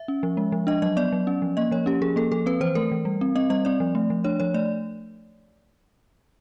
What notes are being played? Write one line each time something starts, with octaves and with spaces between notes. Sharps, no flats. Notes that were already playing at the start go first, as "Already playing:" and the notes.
Already playing: E5
C#4
F3
G#3
F3
D4 D#5
F#3 D#5
B3 D5
F#3
C#4
F3
A#3 D#5
F3 C#5
C#4 G4
F3 G#4
A#3 A4
F3 A4
C4 B4
E3 C5
A3 A#4
E3
G3
C4
C4 D#5
G3 D#5
C4 D5
F3
A3
F3
D4 C#5
F3 C#5
A3 D5